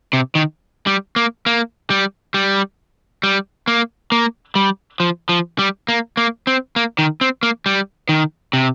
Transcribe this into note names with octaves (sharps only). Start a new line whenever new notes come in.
C3
D#3
G3
A#3
A#3
G3
G3
G3
A#3
A#3
G3
F3
F3
G3
A#3
A#3
C4
A#3
D#3
C4
A#3
G3
D#3
C3